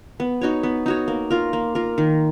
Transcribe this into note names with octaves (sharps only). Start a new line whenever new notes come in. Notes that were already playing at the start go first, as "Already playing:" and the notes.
B3
D#4 F#4 C#5
B3
D#4 F#4 C#5
A#3
F4 A#4
A#3
F4 A#4
D#3